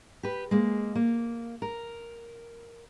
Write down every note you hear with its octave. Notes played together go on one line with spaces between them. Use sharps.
G4 B4
G#3 A#3
A#3
A#4